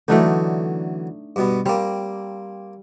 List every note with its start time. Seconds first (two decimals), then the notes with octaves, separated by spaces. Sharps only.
0.08 D3 E3 F#3 A3 D4 D#4
1.36 G2 B2 B3
1.66 G3 A#3 C4